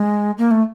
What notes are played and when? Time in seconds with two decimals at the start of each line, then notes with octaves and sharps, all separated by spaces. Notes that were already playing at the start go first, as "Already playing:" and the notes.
Already playing: G#3
0.38 A#3
0.51 A3